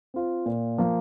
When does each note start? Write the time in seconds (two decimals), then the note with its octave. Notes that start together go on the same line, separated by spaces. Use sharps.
0.14 C4 F4
0.46 A#2
0.78 F3 A#3 F4